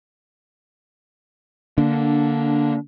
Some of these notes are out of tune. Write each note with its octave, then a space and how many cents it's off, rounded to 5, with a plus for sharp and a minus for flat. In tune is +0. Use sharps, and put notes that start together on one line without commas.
D3 +0 A#3 +0 D4 -15